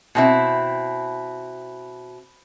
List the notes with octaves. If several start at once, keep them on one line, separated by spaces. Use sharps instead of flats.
B2 C4 E4